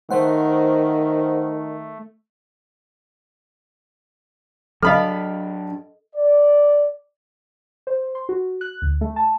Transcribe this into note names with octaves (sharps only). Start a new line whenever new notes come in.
D#3 A3 C5 F#5
F#3 C4 D4 A4 D#5 F5 B5 F6
D5
C5
C6
F#4
F#6
D2
A3
A5